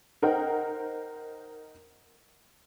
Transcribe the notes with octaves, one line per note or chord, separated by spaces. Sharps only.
D#4 A#4 C5 F#5 G5